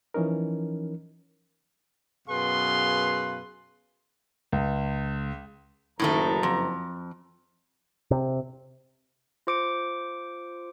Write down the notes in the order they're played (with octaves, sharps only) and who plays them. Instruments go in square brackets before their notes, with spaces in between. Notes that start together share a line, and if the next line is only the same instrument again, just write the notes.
[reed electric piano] E3 F3 C#4 D#4 A#4
[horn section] F#2 B2 G#4 B4 F5 C6
[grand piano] C#2
[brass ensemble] F#1 F#2 A#5 [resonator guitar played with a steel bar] A2 D#3 A3
[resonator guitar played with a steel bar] F2
[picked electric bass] C3
[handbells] F4 C5 D6 C#7 D7